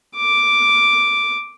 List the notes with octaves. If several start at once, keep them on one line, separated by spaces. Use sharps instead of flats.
D6